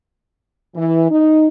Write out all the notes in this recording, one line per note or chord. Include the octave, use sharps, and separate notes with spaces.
E3
D#4